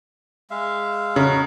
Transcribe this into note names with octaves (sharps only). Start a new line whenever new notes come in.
G#3 E5 F5
C#3 D#4 F#4